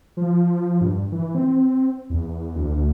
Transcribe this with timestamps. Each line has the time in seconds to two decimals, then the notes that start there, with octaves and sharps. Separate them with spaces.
0.17 F3
0.81 G2
1.12 E3
1.35 C4
2.10 E2
2.56 D2